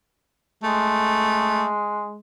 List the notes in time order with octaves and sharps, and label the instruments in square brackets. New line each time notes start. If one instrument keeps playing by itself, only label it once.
[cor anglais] G#3 [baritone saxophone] A3